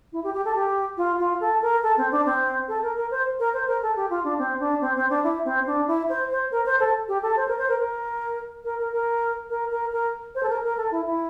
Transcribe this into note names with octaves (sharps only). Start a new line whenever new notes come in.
E4
G4
G4
A4
G4
F4
F4
A4
A#4
A4
C4
D4
C4
A4
A#4
A#4
C5
A#4
C5
A#4
A4
G4
F4
D4
C4
D4
C4
C4
D4
E4
C4
D4
E4
C5
C5
A#4
C5
A4
G4
A4
C5
A#4
C5
A#4
A#4
A#4
A#4
A#4
A#4
A#4
A#4
C5
A4
A#4
A#4
A4
E4
E4